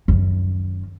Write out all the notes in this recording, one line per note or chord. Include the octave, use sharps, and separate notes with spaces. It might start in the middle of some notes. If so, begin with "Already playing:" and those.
F#2 D#3